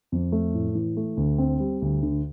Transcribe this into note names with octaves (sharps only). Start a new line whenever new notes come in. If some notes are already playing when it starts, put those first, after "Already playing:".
F2
A3
A2
E3
A3
D2
C4
G3
D2
D3